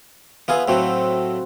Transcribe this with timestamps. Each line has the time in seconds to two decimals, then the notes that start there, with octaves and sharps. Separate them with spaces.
0.48 B3 F4 G#4 B4 E5 F5
0.68 A2 F#3 A3 C4 F#4